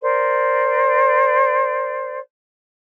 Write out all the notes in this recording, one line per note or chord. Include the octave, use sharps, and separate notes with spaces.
A#4 C5 D5